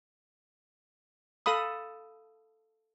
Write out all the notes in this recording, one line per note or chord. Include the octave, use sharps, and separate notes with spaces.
A4 F5 B5 D#6